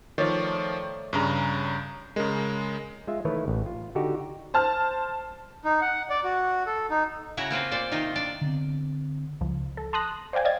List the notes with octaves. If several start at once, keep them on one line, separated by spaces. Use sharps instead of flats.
D#3 F3 A3 C#5 D5
G2 C#3 A#5
C#3 G#3 A#4
G#3 F4 E5
D#3 E3 A3 E4 B4 C#5
A1
F4
D3 D#4 F#4 G4
C5 A5 F6
D#4
F#5
D5
F#4
A4
D#4
C#3 E4 F#4 C#5 A#5
A#3 C4 F4 B4
A#2 C5 D5
C3 D#3 D#4 F4
D4 D5
D3 B3 C4
C#2 F3
A4
A5 C6 D#6 F#6 A#6
C5 D5 F5 G5 G#5
D5 D#5 F5 G#6 A6